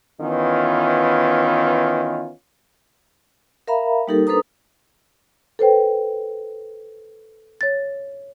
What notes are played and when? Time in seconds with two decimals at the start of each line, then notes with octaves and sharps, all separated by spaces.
0.21 D#3 E3 B3 C#4 F4
3.68 A#4 E5 F5 A#5 B5
4.08 G3 A#3 D#4 G4 A4 A#4
4.27 D4 A4 B4 C5 A#5 D#6
5.59 A4 B4 C5 G5
7.61 C#5 A6